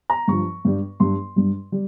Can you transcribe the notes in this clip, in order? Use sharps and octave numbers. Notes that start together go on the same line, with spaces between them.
A#5
G2 F3 C#6
G2 G3
G2 G3 C6
G2 G3
G3